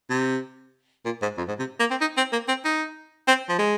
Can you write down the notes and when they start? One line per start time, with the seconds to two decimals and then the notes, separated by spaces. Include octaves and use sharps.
0.10 C3
1.05 A#2
1.22 G#2
1.38 F2
1.48 G#2
1.59 C3
1.80 A#3
1.91 C4
2.01 D#4
2.17 C4
2.33 A#3
2.48 C4
2.65 D#4
3.28 C4
3.49 F3
3.59 G#3